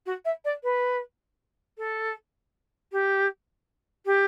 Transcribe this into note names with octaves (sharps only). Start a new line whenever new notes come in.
F#4
E5
D5
B4
A4
G4
G4